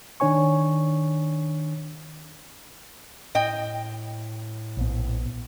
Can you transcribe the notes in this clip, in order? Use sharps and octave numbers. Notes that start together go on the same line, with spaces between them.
D#3 D4 C#5 G#5 C#6
A2 D#5 G5
A#1 B3